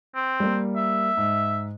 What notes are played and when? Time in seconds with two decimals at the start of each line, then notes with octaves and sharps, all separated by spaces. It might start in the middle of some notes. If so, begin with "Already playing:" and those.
0.15 C4
0.40 G3 A#3
0.77 E5
1.17 G#2